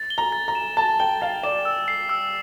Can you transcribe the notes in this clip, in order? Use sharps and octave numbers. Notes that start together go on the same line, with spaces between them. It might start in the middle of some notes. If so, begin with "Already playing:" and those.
Already playing: A6
G7
A#5
A6
A#5
E7
A5 A6
G5 G7
F5 A6
D5 E7
E6
C7
E6